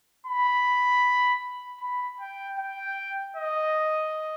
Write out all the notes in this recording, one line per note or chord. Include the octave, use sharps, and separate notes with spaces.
B5
B5
G5
G5
D#5